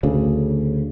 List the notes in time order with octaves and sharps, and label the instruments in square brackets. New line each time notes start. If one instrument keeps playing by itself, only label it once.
[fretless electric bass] D2 C#3